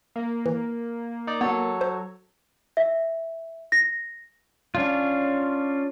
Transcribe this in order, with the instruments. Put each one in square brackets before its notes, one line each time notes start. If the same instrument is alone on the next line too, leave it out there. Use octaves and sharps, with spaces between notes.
[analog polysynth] A#3
[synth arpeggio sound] E3
[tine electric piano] D#4 D5
[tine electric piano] F#3 A4 C#5 [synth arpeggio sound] B3
[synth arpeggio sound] C5
[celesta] E5
A#6
[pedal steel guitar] C#4 D4 F4